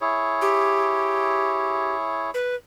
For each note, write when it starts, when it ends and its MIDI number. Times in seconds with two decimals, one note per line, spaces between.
0.01 2.31 64
0.01 2.31 68
0.01 2.31 73
0.41 1.95 67
2.34 2.55 71